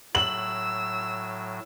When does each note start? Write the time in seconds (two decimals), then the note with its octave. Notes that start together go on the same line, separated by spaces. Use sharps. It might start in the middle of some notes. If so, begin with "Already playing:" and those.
0.15 A2 F#3 E6 F#7